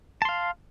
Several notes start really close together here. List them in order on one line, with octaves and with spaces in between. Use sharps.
A5 C6 F5